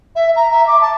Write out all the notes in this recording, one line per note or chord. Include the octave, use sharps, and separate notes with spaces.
E5
A#5
E5
D6
A5